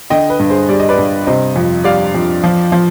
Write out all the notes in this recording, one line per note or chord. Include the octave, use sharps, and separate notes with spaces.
D3 D#5 G5
B4
G2
G#4 C5
G3 D5
D#5
B4 D5
G2
C3 C5 D#5
F2
G3 D5 F5
F2
F3
F3